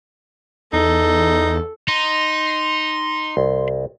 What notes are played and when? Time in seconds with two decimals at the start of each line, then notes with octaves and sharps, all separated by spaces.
0.73 E2 D#4 A4
1.88 D#4 C6
3.37 C2